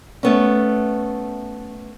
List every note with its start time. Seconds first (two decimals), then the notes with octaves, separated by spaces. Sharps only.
0.23 A3 B3 C#4